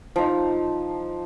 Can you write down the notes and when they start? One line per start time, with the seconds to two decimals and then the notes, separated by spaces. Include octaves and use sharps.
0.16 F3 D#4